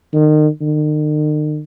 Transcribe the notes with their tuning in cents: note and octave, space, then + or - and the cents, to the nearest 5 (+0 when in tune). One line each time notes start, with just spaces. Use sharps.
D#3 -35
D#3 -45